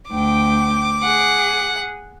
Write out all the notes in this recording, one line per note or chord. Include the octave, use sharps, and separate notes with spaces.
D2 G5 D6
G#4 F#5